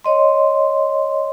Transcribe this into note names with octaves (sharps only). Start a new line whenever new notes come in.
C#5 D#5 C6